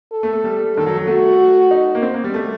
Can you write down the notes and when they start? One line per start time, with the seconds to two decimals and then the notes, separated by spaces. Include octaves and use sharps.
0.12 A4
0.23 A3
0.33 A3
0.44 G3
0.76 D#3 A4
0.86 F#3
0.97 F#3
1.07 A3 F#4
1.71 D#4
1.95 A#3
2.02 C4
2.14 A#3
2.24 G3
2.34 A3